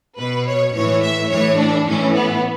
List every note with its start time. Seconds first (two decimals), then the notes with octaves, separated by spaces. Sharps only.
0.19 B2 B4
0.47 C#5
0.75 A2 E3 C#5
1.03 E5
1.31 A2 E3 C#5
1.59 D4
1.88 A2 E3 C#4
2.15 B3